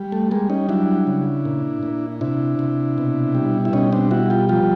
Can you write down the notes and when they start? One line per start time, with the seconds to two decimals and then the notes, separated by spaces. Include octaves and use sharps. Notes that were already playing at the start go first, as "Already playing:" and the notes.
Already playing: G3
0.12 A3
0.31 G3 G#3 A#3
0.50 C#4 D#4
0.69 F#3 D4 E4
1.07 C#3
1.45 A#2
1.83 A#2
2.21 C3 D4 E4
2.59 C3
2.98 B2
3.35 G3
3.65 E4
3.73 B2 C#4 D#4
3.92 C4 D4
4.11 G3 E4 F#4
4.30 F4 G4
4.49 F3 F4 G4